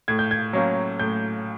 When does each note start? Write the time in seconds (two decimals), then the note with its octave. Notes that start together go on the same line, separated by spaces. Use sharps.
0.08 A2 G#6
0.19 G6
0.31 G#6
0.53 F#3 A#3 C#4
0.99 A2 G6